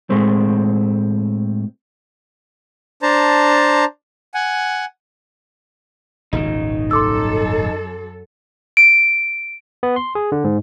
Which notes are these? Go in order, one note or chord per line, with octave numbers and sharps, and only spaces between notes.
A2 G#3 A3 C4
D4 C5 A5 A#5
F#5 G#5
D#1 G#1 C#3 D#4
F#2 F#3 A4 C6 D6 E6
D7
B3
C6
G#4
D3
G#2